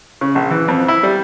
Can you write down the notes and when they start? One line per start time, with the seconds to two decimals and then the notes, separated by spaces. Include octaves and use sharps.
0.21 C#3
0.35 A#1
0.51 E3
0.68 F2
0.88 E4
1.03 G3